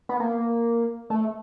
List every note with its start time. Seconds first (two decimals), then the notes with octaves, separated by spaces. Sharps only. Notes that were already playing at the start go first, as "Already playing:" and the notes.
0.09 B3
0.20 A#3
1.10 A3